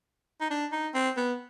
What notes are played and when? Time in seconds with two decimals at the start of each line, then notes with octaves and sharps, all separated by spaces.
0.41 D#4
0.50 D4
0.72 D#4
0.94 C4
1.17 B3